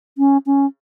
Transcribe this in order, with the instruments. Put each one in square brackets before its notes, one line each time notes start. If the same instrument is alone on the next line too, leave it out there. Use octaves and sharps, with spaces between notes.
[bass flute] C#4
C#4